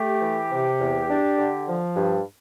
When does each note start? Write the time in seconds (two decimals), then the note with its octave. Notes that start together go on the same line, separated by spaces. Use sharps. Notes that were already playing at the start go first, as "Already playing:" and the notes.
Already playing: A3 G4
0.21 E3
0.50 C3
0.79 E2
1.09 D4
1.38 D3
1.68 F3
1.97 G2